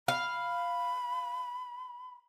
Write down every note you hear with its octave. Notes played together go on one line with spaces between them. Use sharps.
F5 B5